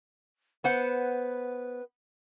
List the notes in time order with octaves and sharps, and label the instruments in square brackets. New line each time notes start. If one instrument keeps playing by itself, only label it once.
[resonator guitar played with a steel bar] B3 C5 F#5 [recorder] B4